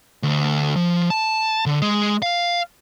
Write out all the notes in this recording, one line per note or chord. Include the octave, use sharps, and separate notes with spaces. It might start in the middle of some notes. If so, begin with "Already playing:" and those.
D2
F3
A5
D3
G#3
F5